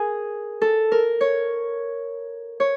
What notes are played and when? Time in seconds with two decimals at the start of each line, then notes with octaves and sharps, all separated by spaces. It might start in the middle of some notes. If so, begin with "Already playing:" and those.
Already playing: G#4 A#4
0.62 A4
0.92 A#4
1.21 C#5
2.60 C#5